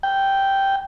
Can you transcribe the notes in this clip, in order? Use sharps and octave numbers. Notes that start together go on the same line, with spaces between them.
G5